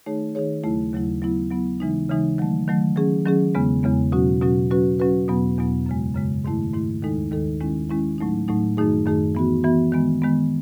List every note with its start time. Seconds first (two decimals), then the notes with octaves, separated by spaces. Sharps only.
0.06 D#3 A3 D#4 G#4 C#5
0.35 D#3 A3 D#4 G#4 C#5
0.64 D#2 C#3 F#3 A3 E4
0.94 D#2 C#3 F#3 A3 E4
1.22 F#3 B3 E4
1.51 F#3 B3 E4
1.80 C#3 E3 G#3 D#4
2.09 C#3 E3 G#3 D#4
2.38 D#3 F#3 A3
2.68 D#3 F#3 A3
2.96 D#3 F#3 C#4 G#4
3.26 D#3 F#3 C#4 G#4
3.55 E2 C#3 G#3 B3
3.83 E2 C#3 G#3 B3
4.12 B2 F#3 C#4 F#4
4.41 B2 F#3 C#4 F#4
4.71 F#3 C#4 F#4 B4
4.99 F#3 C#4 F#4 B4
5.28 E2 B2 F#3 B3
5.58 E2 B2 F#3 B3
5.86 F#2 C#3 G#3
6.15 F#2 C#3 G#3
6.45 G#2 D#3 A3 E4
6.73 G#2 D#3 A3 E4
7.03 D#2 D#3 G#3 D#4 A4
7.32 D#2 D#3 G#3 D#4 A4
7.61 D#3 G#3 C#4 E4
7.90 D#3 G#3 C#4 E4
8.18 A2 F#3 A3 D#4
8.48 A2 F#3 A3 D#4
8.77 F#2 D#3 A3 D#4 G#4
9.05 F#2 D#3 A3 D#4 G#4
9.35 E3 B3 F#4
9.63 E3 B3 F#4
9.92 D#3 G#3 B3
10.22 D#3 G#3 B3